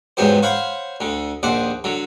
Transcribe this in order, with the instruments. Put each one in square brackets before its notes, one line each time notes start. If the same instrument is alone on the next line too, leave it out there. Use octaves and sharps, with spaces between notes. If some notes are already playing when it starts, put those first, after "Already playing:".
[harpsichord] E2 G#2 F#3 B3 G4 C5
C5 C#5 F5 F#5 B5
D2 D3
A#1 D#2 C5 F#5 D6
D3 F#3